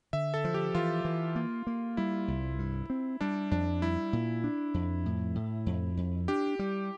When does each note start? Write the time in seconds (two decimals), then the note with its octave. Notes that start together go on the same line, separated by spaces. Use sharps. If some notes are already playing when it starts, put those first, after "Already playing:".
0.13 D3 E5
0.34 A4
0.44 F3
0.54 G4
0.75 E3 F4
1.05 E3
1.35 A#3
1.67 A#3
1.97 G3 E4
2.28 C2
2.59 G2
2.90 C4
3.21 G3 D4
3.51 F2 D4
3.82 G3 E4
4.13 A#2
4.44 D4
4.74 F2
5.06 A2
5.35 A2
5.66 F2
5.97 F2
6.28 D4 G4
6.59 G3